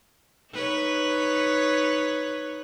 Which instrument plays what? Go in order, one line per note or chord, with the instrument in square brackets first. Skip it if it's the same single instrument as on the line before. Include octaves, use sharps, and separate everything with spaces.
[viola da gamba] D#4 B4 C#5